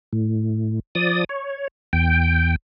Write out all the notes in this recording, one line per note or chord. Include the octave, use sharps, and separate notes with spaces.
A2
F3 D5 D#6
C#5
E2 G5